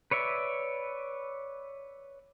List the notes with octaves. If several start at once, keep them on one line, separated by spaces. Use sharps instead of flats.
B4 C#5 D5 E5